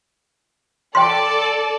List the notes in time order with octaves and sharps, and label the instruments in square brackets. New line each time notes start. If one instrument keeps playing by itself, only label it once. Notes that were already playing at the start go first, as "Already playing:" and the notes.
[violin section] A4 D5 A5 [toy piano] G5 C6